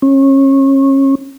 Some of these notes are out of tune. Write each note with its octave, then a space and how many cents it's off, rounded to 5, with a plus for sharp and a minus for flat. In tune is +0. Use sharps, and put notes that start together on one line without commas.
C#4 -30